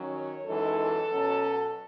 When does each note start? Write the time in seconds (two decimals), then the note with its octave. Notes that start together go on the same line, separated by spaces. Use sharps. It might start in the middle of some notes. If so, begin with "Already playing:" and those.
Already playing: D#3 F#3 C#4
0.14 C#5
0.46 F#2 E3 G#3 D#4 A4
1.12 B2 F#3 C#4